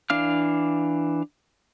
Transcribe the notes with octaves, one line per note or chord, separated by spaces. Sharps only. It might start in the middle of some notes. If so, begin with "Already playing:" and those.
E3 D4 F5 F6